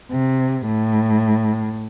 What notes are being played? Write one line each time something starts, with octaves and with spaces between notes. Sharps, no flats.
C3
A2